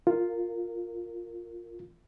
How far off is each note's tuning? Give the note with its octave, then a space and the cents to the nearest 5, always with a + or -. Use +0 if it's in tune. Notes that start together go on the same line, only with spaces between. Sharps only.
F4 +0 A#4 -15